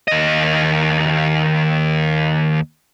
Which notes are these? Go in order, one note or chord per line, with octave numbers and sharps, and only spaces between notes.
D#2 D#5